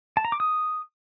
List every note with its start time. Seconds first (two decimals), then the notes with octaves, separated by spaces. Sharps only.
0.17 A5
0.25 A#5
0.32 D6
0.40 D#6